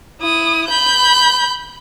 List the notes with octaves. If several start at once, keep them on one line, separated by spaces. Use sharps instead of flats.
E4 D#6
B5 G6